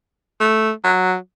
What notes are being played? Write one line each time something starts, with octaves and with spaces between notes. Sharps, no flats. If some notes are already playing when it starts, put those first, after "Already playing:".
A3
F#3